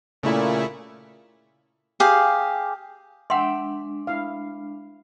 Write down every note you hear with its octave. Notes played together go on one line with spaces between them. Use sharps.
A#2 C#3 A3 E4
G4 G#4 F5
G#3 D4 E5 F#5 G5 C6
E4 F5